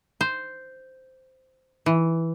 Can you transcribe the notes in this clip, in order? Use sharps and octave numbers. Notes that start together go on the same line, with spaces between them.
C5
E3